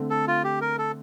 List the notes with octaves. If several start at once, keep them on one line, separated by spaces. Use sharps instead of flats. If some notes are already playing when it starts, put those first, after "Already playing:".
Already playing: D3 A3 C4
A4
F4
G4
A#4
A4